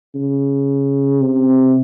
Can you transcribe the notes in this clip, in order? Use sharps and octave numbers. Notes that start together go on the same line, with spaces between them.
C#3
C3